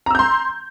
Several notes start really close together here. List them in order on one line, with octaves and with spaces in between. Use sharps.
A#5 E6 G6 C6